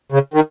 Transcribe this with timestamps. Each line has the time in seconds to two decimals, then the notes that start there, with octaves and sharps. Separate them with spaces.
0.12 C#3
0.34 D#3